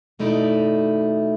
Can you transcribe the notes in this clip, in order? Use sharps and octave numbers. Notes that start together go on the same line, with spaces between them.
D#2 B2 A3 D#4 E4 D5